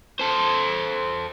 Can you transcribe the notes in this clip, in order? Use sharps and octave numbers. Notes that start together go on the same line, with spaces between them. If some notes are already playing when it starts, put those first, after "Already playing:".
A4 C5